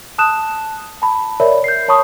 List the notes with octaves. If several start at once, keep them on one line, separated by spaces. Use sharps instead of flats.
A5 D#6 F#6 E7
A5 B5
A#4 C#5 D5 E5 B5
G6 C7
C#5 A5 B5 C#6 D#6